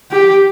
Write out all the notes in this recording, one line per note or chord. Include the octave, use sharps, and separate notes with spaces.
G4